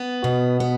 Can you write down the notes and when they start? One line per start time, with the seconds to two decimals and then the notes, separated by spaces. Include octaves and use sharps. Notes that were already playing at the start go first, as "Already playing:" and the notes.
Already playing: B3
0.24 B2
0.60 B3